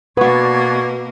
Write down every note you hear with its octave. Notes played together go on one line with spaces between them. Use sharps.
B2 A#3 B3 D4 F#4 B4 C#6 G#6